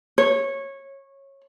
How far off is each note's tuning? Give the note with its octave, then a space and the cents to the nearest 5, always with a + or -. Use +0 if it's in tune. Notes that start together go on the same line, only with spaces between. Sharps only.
C#5 -15